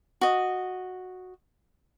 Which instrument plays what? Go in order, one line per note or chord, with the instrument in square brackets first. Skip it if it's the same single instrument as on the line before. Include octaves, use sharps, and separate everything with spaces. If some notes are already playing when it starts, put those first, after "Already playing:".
[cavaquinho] F#4 D#5